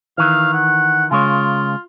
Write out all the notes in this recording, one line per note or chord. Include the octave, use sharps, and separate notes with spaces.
D#3 E3 F5
F#5
C#3 G#3 F4 C#5